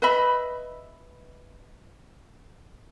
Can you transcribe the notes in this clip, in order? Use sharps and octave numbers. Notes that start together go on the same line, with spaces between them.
B4 D#5 E5 B5